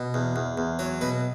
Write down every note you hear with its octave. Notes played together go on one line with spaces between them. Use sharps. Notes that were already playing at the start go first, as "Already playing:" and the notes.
Already playing: B2
E2
E2
E2
F#3 C#5
B2 B4